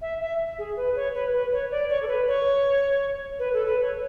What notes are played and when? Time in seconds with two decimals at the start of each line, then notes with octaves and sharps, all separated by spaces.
0.01 E5
0.21 E5
0.59 G#4
0.76 B4
0.96 C#5
1.14 B4
1.33 B4
1.52 C#5
1.71 D5
1.89 C#5
2.02 A4
2.08 B4
2.27 C#5
3.39 B4
3.53 A4
3.66 B4
3.81 C#5